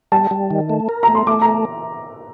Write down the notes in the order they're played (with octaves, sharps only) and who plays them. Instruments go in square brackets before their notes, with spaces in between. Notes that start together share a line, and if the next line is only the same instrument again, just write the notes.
[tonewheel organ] G3 [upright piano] A5
[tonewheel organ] G3
D#3
A3
A#4
[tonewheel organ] A3 [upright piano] A#5
[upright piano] C6
[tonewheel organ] A3 [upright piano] D6
[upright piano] A#5